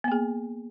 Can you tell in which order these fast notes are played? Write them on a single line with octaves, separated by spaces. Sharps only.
B3 A#3 G#4